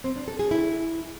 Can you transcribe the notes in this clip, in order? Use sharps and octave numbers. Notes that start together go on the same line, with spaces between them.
C4
D4
A4
G#4
E4